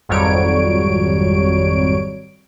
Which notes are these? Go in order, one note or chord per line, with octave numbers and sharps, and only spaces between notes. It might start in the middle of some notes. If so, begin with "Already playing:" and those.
G#1 F2 F#3 G3 C#5 D7